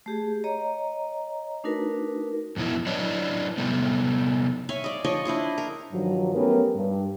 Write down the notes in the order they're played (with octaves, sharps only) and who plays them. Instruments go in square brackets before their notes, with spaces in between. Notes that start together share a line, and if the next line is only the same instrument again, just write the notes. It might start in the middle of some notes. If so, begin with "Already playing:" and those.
[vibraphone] A3 G4 G#4
C#5 D#5 A#5
A3 D4 D#4 F#4 A#4 B4
[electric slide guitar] F2 B2 E3 E4
F#3 D4 E4 B4 C#5 D#5
C3 G3 A3 B3
[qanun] C#5 E5 F5 G#5
D5 D#5
F3 C#5 D#5 G#5
D4 E4 C5 D#5
A#4
[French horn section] G2 D#3 F3 F#3
A3 B3 C#4 G4 A#4 B4
G2